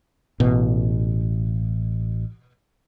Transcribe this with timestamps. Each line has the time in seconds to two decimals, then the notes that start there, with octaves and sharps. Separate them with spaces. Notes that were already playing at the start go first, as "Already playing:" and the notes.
0.40 A1 B2